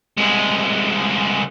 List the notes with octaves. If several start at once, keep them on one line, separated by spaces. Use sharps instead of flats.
C2 G#3